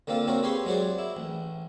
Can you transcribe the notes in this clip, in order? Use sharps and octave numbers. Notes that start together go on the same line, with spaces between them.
D3 A#3 C4 F4 A4
C4 C#4 F#4 A#4
G4 G#4 B4 G#5 C6 C#6
F#3 G#3 F#4 C5 D5
E4
A1